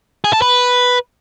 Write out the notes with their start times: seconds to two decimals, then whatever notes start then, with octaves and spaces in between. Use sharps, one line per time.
0.24 G#4
0.33 A4
0.42 B4